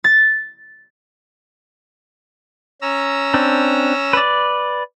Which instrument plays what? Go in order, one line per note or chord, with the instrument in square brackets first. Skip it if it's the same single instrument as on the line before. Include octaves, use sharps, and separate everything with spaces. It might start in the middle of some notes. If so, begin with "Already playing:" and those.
[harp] A6
[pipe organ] C#4 A#5 E6
[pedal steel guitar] C4 D4
B4 D5